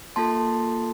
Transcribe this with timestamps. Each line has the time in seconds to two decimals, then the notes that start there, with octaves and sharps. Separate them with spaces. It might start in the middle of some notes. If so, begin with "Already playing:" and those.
0.16 A#3 F4 A4 A5 C6